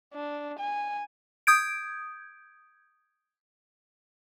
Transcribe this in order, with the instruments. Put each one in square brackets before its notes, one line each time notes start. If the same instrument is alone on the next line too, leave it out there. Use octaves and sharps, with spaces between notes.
[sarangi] D4
G#5
[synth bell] D#6 G6 G#6 D7